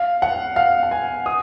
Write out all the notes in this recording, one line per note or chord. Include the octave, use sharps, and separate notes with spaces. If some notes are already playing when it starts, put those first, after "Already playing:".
Already playing: F5
F#5
F5
F#5
G#5
D#6